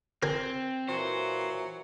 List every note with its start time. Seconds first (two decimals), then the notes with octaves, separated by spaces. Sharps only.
0.23 C4 A#4 G#5
0.89 A#2 E3 F#3 C5